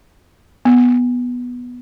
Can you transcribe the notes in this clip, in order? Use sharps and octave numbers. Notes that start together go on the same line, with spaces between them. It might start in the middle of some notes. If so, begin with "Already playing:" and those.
B3